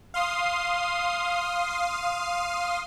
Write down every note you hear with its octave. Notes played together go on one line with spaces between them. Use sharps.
F5 C6 D#6 C7